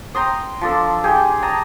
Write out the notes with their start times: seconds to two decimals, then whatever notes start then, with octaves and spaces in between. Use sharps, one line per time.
0.15 G5 A#5 C6 D#6
0.61 F3 D4 A4
1.04 G4 G#4 G5
1.42 D#5 A5 A#5